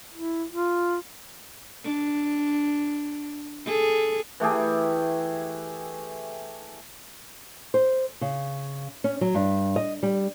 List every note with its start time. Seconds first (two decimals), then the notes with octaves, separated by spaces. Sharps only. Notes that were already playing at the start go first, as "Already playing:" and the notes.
0.13 E4
0.52 F4
1.84 D4
3.65 G#4 A4
4.40 E3 A3 G4 G#4
7.74 C5
8.21 C#3
9.04 C#4
9.21 F#3
9.35 G2
9.76 D#5
10.03 G3